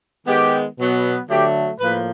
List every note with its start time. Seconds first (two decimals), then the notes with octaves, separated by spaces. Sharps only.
0.25 D#3 G#3 B3 G4
0.77 B2 F#3 B3
1.28 D3 F#3 A3 G4
1.79 A2 F3 A#3 B4